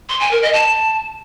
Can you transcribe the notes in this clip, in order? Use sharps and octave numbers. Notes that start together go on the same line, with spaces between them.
C6
G#5
A#4
D#5
A5